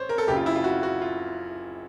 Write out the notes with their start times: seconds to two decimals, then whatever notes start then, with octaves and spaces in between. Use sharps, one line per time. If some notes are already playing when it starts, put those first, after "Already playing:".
Already playing: A1 C5 C#5
0.09 A#4
0.18 A4
0.27 F#1 F#2 C#3 G4
0.37 F4
0.46 E4
0.56 F4
0.64 F#4
0.83 F#4
1.02 F4